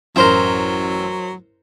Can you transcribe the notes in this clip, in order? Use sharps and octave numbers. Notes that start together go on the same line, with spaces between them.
A1 F#2 F#3 A#4 C5 E5